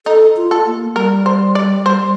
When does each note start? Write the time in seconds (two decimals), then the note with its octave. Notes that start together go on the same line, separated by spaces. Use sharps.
0.06 D#4 A4
0.37 F4
0.51 A4
0.67 A#3
0.95 G3 A#4
1.26 C5
1.55 D5
1.86 C5